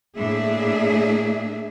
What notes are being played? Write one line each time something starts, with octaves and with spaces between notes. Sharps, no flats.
A2 A#3 D4 G#4 E5